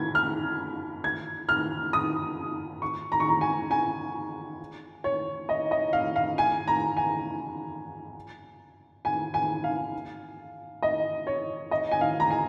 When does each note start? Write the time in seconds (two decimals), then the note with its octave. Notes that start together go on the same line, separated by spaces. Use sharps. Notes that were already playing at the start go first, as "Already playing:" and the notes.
Already playing: G#6
0.15 F6
1.04 G#6
1.49 F6
1.93 D#6
2.82 C#6
3.12 A#5
3.20 C#6
3.29 A#5
3.41 G#5
3.71 G#5
5.04 C#5
5.49 D#5
5.71 D#5
5.93 F5
6.16 F5
6.38 G#5
6.68 A#5
6.97 G#5
9.05 G#5
9.34 G#5
9.64 F5
10.82 D#5
11.27 C#5
11.71 D#5
11.91 G#5
12.01 F5
12.20 A#5
12.31 G#5